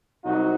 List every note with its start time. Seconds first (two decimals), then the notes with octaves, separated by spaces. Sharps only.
0.24 C2 C3 F#3 D#4 F#4